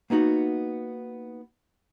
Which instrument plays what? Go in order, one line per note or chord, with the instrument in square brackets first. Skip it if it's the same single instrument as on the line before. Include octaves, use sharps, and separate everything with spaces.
[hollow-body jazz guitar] A#3 B3 D#4 F#4